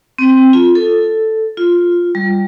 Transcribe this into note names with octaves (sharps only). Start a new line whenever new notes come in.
C4
F4
A4
F4
G3